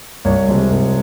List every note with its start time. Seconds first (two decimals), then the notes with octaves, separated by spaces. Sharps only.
0.25 C2 C#5
0.48 C3 F3 G#3
0.70 C2